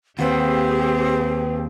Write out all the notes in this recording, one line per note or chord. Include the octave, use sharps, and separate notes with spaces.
D#2 C4 G4 G#4 B4 F#5